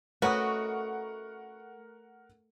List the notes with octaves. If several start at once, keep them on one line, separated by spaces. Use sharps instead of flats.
A3 C#4 F#4 A#4 B4 D#5 F#5 C#6